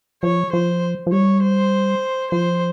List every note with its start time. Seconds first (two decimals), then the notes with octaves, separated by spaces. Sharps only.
0.23 F3 C#5
0.53 F3 C5
1.07 F3
1.12 G3 C#5
1.42 C5
2.31 F3 C5